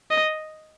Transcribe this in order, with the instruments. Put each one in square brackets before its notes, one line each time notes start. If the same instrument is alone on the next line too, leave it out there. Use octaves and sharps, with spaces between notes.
[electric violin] D#5